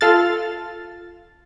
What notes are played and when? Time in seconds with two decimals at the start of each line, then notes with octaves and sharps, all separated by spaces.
0.01 F4 A4 F6 A6